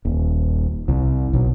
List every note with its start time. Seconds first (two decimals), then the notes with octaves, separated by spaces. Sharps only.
0.05 D#1
0.88 C2
1.33 B1